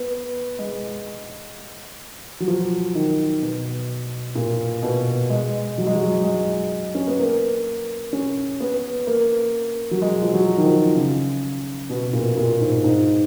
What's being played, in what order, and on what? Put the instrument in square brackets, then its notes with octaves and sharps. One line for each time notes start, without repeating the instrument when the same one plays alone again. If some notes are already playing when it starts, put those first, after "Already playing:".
Already playing: [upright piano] B3
G#3
F#3
F3
D#3
B2
A#2
B2
G#3
F#3
G#3
F#3
G#3
C#4
B3
A#3
C#4
B3
A#3
F#3
G#3
F3
F#3
D#3
F3
C#3
B2
A#2
A#2
G#2
G#2